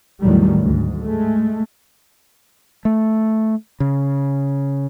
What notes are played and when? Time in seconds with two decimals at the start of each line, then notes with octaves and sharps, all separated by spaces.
0.21 A1 E2 A2 D#3 F#3 G3
0.58 D2 G#2
1.02 G#3 A3
2.85 A3
3.80 C#3